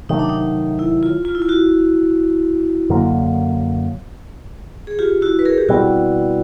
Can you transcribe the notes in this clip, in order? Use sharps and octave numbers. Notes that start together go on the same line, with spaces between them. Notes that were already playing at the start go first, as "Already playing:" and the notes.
C3 D#3 F#3 A3 D#4
D4
D#4
E4
F4
F4
E4
F4
E4 F#4
F#2 D3 F#3 A#3
G#4
F4 G4
E4 F#4
B4
G#4 A#4
G4
B2 G3 C4 E4 F#4